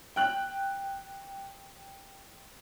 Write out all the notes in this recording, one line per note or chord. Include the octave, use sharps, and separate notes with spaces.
G5 F#6 F#7